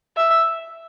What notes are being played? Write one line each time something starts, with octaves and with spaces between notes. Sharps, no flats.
E5